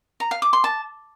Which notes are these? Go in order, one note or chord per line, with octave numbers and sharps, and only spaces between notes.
A#5
F5
D6
C6
A5